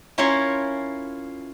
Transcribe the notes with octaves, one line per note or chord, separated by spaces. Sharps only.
C#4 E4 F4 A#4 C#5 C6